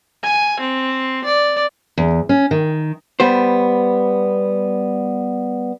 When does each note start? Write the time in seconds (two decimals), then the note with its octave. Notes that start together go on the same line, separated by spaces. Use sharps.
0.24 G#5
0.60 C4
1.25 D5
1.98 E2
2.29 C#4
2.51 D#3
3.20 G3 B3 C5